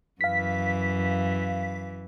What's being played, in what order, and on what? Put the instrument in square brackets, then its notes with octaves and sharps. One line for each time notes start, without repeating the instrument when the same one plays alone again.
[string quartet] F#2 E3 [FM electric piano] F5 B6